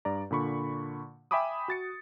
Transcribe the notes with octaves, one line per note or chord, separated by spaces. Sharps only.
G2 D5 A#5
A#2 D3 B5 C#6
E5 G5 G#5 B5 D6 D#6
F#4 A6 C#7